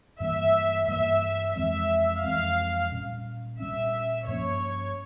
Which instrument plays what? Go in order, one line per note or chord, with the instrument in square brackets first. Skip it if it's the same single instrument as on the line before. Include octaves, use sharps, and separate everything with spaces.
[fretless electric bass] G2 E3 G3 A#3 [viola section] E5
[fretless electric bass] G2 E3 G3 A#3 [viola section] E5
[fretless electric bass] F2 E3 G#3 C4 [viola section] E5
[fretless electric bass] F2 E3 G#3 C4 [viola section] F5
[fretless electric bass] A#2 G3 C#4
[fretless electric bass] A#2 G3 C#4 [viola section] E5
[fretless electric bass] G2 F3 A#3 C#4 [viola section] C#5